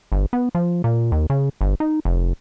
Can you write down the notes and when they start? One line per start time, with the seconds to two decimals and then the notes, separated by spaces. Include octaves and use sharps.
0.12 G1
0.33 B3
0.55 F3
0.84 A#2
1.12 D#2
1.30 C#3
1.61 G1
1.80 D#4
2.05 F1